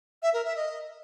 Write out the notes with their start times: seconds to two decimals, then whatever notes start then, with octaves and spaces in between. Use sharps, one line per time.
0.23 E5
0.34 A#4
0.45 E5
0.56 D#5